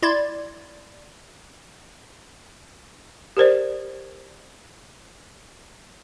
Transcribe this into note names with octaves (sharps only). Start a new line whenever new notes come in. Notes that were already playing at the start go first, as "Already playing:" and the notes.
E4 D5 C6 G#6 A6
G4 A#4 C5 D5